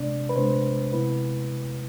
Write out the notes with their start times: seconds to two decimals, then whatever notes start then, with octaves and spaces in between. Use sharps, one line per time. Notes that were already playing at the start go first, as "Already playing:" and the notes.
Already playing: C3 G#3 B3 D4 D5
0.29 B4
0.36 C3 G#3 B3 D4 C5
0.93 C3 G#3 B3 E4 B4